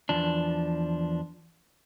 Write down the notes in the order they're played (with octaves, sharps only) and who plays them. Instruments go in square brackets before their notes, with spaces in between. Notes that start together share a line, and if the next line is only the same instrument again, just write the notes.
[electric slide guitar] E2 F3 D4